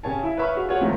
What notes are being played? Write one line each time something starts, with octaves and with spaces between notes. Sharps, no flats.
C#3 G4 C#5 G#5 A5
E4 E5
B4 C#5 E5 B5 C#6 F6
F#4 G#4 F5
F4 F#4 G#4 C#5 F#5
C#2 D#3 F3 A3